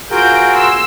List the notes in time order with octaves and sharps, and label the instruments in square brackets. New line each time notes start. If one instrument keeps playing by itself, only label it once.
[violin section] F4 G6 D7 [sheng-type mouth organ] F#4 G#4 A#4
[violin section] C6 E6